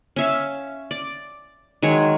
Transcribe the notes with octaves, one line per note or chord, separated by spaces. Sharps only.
C#4 E5 F5
D5
D#3 F#3 G#3 C#5